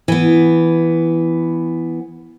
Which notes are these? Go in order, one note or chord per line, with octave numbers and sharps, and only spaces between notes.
E3 B3